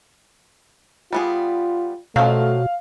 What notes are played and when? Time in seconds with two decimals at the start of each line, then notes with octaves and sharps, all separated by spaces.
1.13 G3 B3 F4 G#4
2.16 B2 F3 F#3 A3 F5